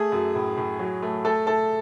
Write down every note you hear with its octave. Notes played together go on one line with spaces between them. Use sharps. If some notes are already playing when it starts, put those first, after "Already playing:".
Already playing: A3 G#4
F#2
A2
A2
F#3
A3
A3 A4
A3 A4